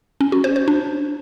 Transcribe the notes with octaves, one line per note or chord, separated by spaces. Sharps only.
C#4
F#4
C5
C5
D4